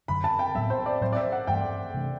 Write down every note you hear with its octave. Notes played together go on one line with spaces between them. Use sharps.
F#2 D3 F#3 B5
A5
G5
A2 F#3 B3 E5
C5
D5
A2 F#3 C4 C5
D5
E5
F#5
G2 E3 A3 C4 G5
C3 E3 A3 D4